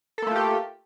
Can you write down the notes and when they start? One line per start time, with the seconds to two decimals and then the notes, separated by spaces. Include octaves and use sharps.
0.18 A4
0.22 A#3
0.27 A3
0.31 F4
0.35 G4